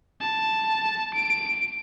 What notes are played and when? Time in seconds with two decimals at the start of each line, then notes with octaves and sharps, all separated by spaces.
0.21 A5
1.14 D7